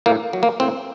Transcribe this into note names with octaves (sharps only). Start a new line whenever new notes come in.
A2 A#3
F#3
A#3
A2 C4